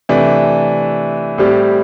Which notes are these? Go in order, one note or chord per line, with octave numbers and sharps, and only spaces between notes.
C3 E3 A3 D4
A2 G3 C4 G4 D5